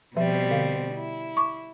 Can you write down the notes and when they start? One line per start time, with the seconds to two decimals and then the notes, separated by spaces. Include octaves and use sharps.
0.17 B2 F3 G3 C4 E5
0.50 D3 F5
0.93 E4
1.37 C#6 D6